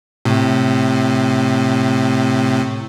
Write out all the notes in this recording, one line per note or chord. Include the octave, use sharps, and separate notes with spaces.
A2 C3